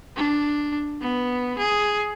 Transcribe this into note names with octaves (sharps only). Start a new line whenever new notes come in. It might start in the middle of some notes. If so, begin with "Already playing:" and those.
D4
B3
G#4